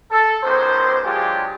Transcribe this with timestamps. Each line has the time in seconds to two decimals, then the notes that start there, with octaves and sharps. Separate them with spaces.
0.11 A4
0.44 C#2 B2 D#3 C5
1.05 F#3 G#3 D4 F4 G4 G#4